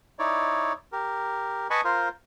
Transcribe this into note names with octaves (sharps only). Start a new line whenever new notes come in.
D#4 E4 C#5 D5
G4 A#4
B4 D#5 G#5 A5 B5 C#6
F4 A#4 C5